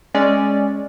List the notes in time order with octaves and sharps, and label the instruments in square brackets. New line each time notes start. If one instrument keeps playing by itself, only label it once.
[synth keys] G#3 C#4 D5